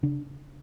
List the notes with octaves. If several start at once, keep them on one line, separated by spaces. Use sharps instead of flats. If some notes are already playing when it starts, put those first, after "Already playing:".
C#3 D4